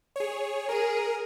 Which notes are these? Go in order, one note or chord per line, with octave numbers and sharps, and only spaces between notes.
G#4 C#5
G#4 A#4